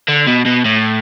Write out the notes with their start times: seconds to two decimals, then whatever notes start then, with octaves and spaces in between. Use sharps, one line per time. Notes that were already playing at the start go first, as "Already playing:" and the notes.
0.08 D3
0.27 B2
0.46 B2
0.65 A2